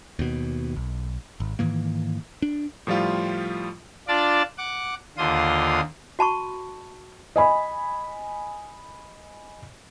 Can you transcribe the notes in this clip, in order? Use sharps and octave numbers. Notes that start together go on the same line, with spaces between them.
D#2 B2
B1
G#1
G#2 D#3 E3 A#3
D4
A2 F3 G3 F4
D4 F4 D5 A5
F#5 D6
D#2 D3 F4 C6 D#6
F#4 A5 B5 C#6
D#5 G#5 B5